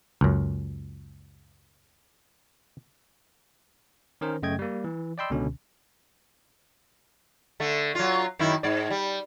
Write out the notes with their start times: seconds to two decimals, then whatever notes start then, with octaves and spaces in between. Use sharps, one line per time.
0.21 C#2 F#2
4.21 D#3 C#4 A#4 C5
4.42 F#2 C#3 A3 D#5 G5 G#6
4.59 G3 A#3
4.84 E3
5.18 D5 D#5 G5 B5 C6 E6
5.30 C#2 B2 D3 C#4
7.60 D3 A3
7.95 F#3 F4
8.39 F#2 D#3 E4
8.63 G#2 D5
8.90 G3